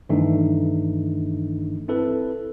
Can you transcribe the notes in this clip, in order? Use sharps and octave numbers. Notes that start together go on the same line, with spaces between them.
G2 D#3 E3 A3 D4 D#4
C4 E4 A4 B4